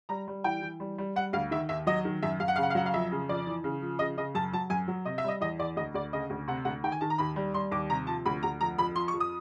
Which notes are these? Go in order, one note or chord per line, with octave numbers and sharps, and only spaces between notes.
G3 A#5
G3
E3 G5
E3
G3
G3
G3 F#5
D2 F5
D#3 E5
D#2 E5
F#3 D#5
D#3
F#2 E5
F#2 F5
F#5
C#3 F5
F#5
F5
F#3 F#5
F5
F2 E5
C#3
F2 D5
E3
C#3
F3
C#3 D#5
C#3 D#5
F#2 A5
F#3 A5
F#2 G#5
F#3
C3 D#5
E5
G3 D#5
E2 D#5
E2 D5
D2 D#5
D2 D5
C#3 D#5
D2
C3 F#5
D2 F#5
D#3 G5
G#5
D#3 A5
A#5
D#2 B5
G3
G3 C6
D#2 D6
C3 A#5
F3 A5
D2 B5
D2 A#5
F2 A#5
F2 B5
F3 C6
C#6
F2
D#6